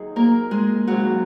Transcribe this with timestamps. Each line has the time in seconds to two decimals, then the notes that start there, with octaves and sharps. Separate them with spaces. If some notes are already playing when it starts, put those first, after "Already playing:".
Already playing: D#2 D#3 F#3 D#4 G#4 D#5
0.16 A#3 A#4
0.51 G#3 G#4
0.87 D#2 C#3 F#3 G#3 F#4